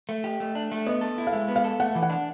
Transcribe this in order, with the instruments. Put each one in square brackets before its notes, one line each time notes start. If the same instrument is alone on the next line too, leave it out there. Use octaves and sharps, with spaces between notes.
[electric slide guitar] A3
G4
A3
D4
A3
[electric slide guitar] B3 [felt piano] D#5
[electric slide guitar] A4
E4
[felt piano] F5
[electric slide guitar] G#3 [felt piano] E5
[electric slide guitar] B3
[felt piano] F5
[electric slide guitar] A4
[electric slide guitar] A3 [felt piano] F#5
[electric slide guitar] E3
[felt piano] F#5
[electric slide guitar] D4